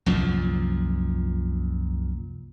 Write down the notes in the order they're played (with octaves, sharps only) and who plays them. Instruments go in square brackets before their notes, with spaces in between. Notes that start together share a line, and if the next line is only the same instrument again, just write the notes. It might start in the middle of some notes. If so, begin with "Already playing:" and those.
[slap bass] C2 F#2 A#2 F3